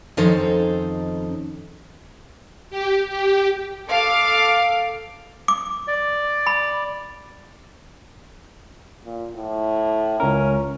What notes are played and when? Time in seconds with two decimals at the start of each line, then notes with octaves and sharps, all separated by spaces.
0.17 F2 D#3 C#4 D#4 A4 C5
2.70 G4
3.09 G4
3.88 A4 F5 D6
5.48 D6
5.88 D5
6.47 B5
9.04 A#2
9.35 A2
10.20 C#2 C#4 A#4